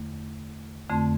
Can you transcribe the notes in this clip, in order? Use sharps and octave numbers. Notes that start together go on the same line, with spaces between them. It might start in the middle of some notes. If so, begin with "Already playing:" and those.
Already playing: E2 D3 A3
F2 D3 A3 C4